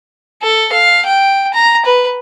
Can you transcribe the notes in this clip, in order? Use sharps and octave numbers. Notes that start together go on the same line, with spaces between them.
A4
F5
G5
A#5
B4